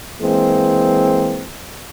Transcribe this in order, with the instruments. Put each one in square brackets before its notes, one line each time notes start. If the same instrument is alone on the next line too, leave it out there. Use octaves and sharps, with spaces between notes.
[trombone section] E3 G#3 A#3 C4